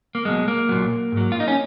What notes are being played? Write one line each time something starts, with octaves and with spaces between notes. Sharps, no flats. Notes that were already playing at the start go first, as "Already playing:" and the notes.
A#3
B1 B2 F#3 G#3
A#3
B1 A#2 F#3
G#2
F#3
F4
D#4
C#4